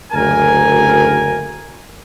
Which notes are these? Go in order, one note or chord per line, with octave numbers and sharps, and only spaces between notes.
F#1 D2 A#4 G#5